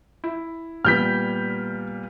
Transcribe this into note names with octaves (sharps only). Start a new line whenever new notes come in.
E4
A#2 G3 B3 F6 G6 B6